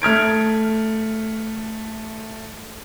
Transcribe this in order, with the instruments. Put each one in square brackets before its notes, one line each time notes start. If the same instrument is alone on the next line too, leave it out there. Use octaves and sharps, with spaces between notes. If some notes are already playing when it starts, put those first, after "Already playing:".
[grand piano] A3 F6 G#6 D7